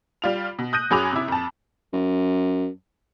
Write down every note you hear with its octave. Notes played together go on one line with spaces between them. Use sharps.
G3 F4 F7
B2
D#6 F#6 G6 A#6 D#7
F#2 F#3 G#4 B5 D6 F7
C3 E4
F2 A5
F#2